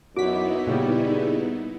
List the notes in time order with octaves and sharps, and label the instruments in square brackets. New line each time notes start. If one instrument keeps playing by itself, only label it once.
[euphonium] F#2 [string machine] B3 D#4 E4 [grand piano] F#4 [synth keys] D6 B6
[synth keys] A#2 C#3 G3 [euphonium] G#4